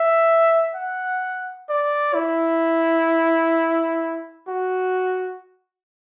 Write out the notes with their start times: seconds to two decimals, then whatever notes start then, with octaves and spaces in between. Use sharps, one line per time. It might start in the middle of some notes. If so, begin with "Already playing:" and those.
Already playing: E5
0.75 F#5
1.69 D5
2.14 E4
4.48 F#4